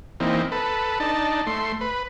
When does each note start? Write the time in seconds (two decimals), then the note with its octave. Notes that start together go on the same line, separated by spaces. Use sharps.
0.20 E3 A#3 C4 D#4
0.52 A4 B4
1.00 D4 D#4 A5
1.47 A3 C6
1.81 B4